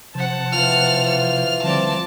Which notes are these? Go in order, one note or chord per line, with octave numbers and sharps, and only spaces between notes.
C3 F3 C5 F#5 A5
E3 F4 F6
F6
D3 F3 G3 C4 D5 A5